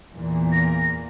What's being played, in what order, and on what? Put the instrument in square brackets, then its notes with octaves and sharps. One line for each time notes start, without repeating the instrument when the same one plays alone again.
[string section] E2 A#2
[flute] A#6